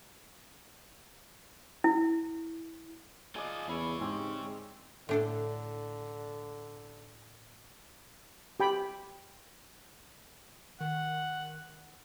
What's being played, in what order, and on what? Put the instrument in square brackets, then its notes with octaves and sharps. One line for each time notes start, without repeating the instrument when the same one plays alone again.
[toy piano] E4
[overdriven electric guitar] F4 D#5 [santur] G#4 D5
[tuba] E2 [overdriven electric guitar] G#4 C#5 [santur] E5 B5 E6
[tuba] G#2 [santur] G#3 C4 G4
[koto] A2 D4 A4 [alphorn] D3
[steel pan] G4 G5 B5
[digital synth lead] D#3 [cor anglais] F#5